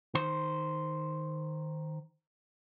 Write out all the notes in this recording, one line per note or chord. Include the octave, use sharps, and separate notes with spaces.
D#3 C5